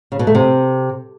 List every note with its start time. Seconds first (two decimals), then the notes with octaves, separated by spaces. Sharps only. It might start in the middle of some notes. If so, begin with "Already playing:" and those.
0.12 C#3
0.19 B2
0.27 A3
0.35 C3